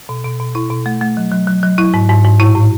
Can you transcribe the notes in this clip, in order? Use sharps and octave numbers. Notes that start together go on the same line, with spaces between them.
B2
B2
B2
B2 E4
B2
A3
A3
F#3
F#3
F#3
F#3
F#3 E4
G#2
G#2
G#2
A2 E4
A2